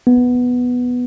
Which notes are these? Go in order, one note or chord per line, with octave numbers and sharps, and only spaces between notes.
B3